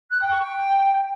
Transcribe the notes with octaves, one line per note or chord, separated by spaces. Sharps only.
F#6
G5
C#6
G5